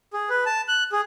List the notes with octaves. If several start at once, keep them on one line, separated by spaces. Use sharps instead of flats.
G#4
B4
A5
F#6
G#4